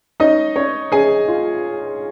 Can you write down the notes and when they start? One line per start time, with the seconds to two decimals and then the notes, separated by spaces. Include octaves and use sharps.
0.20 C#4 D#4 D#5
0.56 C#4 C#5
0.92 C#4 G#4 G#5
1.28 F4